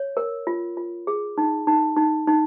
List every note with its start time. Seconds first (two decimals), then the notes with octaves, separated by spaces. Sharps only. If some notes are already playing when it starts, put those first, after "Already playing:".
Already playing: C#5
0.17 A#4
0.47 F4
0.77 F4
1.07 G#4
1.38 D#4
1.67 D#4
1.96 D#4
2.27 D#4